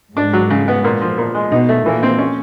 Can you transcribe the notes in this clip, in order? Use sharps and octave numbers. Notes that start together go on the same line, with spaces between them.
G#2 G#3 D4
F#3
C#3
B3
A#2
F3
A#2
G#3
B2 B3 D#4
A3
A#2 E3 A#3
C4
C#4